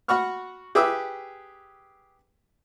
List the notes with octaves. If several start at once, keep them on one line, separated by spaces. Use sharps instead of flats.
F#4 F#5 B5 C#6 F6
G4 G#4 B4 G5 D6 E6